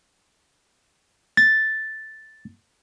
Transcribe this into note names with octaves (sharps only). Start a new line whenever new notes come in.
A6